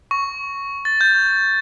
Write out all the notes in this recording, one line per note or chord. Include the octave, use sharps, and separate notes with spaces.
C#6
A6
G6